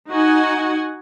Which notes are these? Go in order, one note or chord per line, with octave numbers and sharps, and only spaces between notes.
D#4 F#4 F#5 G#5